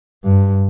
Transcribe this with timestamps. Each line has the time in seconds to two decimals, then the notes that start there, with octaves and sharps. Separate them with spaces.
0.25 G2